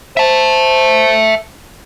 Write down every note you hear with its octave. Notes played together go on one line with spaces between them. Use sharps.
C5 E5 A5